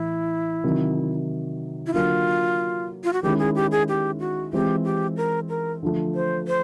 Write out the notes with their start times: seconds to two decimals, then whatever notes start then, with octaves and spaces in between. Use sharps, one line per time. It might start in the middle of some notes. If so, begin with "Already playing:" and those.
Already playing: A2 E3 E4
0.64 C3 D#3 F#3
1.87 E4
1.94 D3 F#3 A#3 F4
3.04 F4
3.13 F#4
3.23 D#3 G#3 C#4 E4 G4
3.39 G#4
3.55 G4
3.72 G#4
3.89 G4
4.20 F#4
4.53 E3 G#3 C4 F4 G4
4.85 G4
5.17 A#4
5.49 A#4
5.83 D3 F3 A3
6.15 C5
6.48 C5